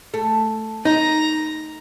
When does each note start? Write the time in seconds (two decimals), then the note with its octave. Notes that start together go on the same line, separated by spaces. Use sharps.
0.14 A3
0.85 D#4 A#5